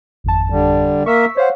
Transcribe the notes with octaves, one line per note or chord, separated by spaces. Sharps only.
G#1 F2 A5
D3 G3
A#3 A#4 E5 C#6 E6 B6
C5 C#5 F5 F#5